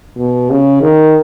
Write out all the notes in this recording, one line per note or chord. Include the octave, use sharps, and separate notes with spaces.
B2
C#3
D#3